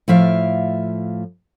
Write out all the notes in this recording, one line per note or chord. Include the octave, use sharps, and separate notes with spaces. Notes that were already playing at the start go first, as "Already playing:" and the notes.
A2 F3 E5 F5